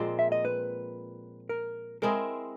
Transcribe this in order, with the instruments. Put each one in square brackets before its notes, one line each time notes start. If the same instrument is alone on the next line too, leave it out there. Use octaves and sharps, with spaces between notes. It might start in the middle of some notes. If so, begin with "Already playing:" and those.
Already playing: [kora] A#2 F3 G#3 C4
[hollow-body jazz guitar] E5
D#5
B4
A#4
[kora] G#3 C4 E4 G#4 [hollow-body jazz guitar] A#4